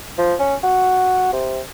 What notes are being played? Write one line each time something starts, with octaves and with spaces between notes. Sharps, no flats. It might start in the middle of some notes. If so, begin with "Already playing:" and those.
F3
C#4
F#4
C3